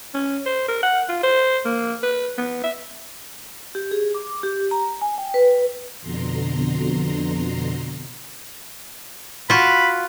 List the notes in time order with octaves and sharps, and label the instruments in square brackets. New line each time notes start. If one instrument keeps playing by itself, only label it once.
[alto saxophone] C#4
C5
A#4
F#5
F4
C5
A#3
B4
B3
E5
[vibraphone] G4
G#4
D6
G4
A#5
G#5
G5
B4
[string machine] F2 B2 D3 A#5 C6
[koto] F4 F#4 [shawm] B5